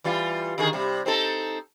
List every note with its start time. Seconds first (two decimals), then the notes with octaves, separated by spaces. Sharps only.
0.04 E3 G3 F4
0.58 D3 D#3 G#4
0.73 C3 G3
1.06 C4 D#4 A4